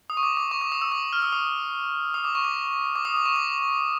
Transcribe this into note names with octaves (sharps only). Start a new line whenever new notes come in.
D#6
C#6
D6
D6
C#6
D6
D#6
E6
D6
F6
E6
D#6
D#6
D6
C#6
D6
D6
D#6
D6
C#6
D6